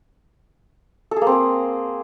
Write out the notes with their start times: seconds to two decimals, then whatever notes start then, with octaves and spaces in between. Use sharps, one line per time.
1.11 A4
1.16 G#4
1.22 A#3
1.27 C4
1.32 G#4